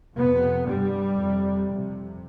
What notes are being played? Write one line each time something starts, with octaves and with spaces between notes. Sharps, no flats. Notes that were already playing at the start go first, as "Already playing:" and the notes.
F2 C3 B3
G2 G3
F2 C3
F2 C3